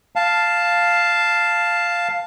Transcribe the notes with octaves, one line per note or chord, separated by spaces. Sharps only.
F5 A5